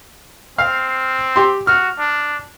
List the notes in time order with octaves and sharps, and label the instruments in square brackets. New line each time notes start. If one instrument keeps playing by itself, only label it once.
[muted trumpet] C4 [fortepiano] F5 F6
[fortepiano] G4 C6
[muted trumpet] F#4 [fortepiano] F6
[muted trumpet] D4